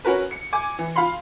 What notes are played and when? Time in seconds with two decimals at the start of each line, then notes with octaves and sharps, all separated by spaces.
0.05 C#4 F#4 A#4 B4
0.31 C#7
0.53 G#5 D6
0.79 E3
0.96 F4 F5 B5 C6